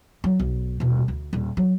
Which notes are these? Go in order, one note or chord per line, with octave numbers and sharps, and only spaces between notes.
F#3
B1
D#1 B2
D2
D#1
F#3